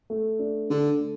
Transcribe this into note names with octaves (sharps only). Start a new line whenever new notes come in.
A3
D4
D3 A4
A3